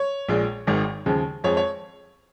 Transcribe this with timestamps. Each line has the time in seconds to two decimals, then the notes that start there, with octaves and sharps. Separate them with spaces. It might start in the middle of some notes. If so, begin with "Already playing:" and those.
Already playing: C#5
0.29 A#1 A#2 G#3
0.67 G#1 G#2 D#3 G#3
1.06 D#2 C#3 F3 G#3
1.44 F2 F3 G#3 C#5
1.57 C#5